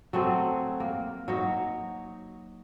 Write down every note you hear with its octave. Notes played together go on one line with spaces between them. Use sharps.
F#3 A3 C4 G#4
A#3
F#3 D#4 C#5